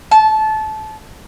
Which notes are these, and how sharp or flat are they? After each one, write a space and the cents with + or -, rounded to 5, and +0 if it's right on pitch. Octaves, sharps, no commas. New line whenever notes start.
A5 -20